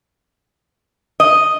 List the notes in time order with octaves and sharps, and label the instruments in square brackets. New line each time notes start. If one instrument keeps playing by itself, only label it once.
[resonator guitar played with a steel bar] D#5